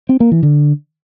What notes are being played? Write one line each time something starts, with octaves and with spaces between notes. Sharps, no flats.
C4
A#3
E3
D3